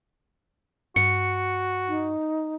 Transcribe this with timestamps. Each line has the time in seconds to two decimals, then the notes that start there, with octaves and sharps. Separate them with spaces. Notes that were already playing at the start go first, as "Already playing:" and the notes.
0.96 G2 F#4 C#7
1.88 D#4